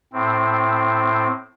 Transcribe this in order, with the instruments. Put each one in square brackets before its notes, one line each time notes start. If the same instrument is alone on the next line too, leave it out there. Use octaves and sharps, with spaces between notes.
[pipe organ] A2 C4